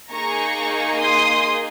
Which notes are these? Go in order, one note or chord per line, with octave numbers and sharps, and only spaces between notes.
A#3 D#4 G#4 A#5 C#6
C6 D#6